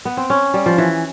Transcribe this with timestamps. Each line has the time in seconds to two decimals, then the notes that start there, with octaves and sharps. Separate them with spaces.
0.05 B3
0.17 C4
0.30 C#4
0.54 G3
0.66 F3
0.78 E3